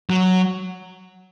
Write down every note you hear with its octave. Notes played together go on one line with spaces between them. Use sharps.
F#3